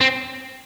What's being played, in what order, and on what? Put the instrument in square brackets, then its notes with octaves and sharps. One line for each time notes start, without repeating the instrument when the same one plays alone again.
[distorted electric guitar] C4